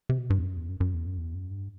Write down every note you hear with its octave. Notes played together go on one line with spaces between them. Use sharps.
C3
B2
G2
E2
F#2
E2
F#2
F#2
E2
F#2
E2
F#2
G2